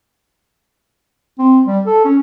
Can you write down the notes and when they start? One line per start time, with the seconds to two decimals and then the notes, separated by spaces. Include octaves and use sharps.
1.39 C4
1.67 G3
1.86 A4
2.05 C#4